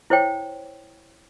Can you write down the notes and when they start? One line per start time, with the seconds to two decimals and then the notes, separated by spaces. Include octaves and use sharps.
0.10 E4 C5 C#5 G5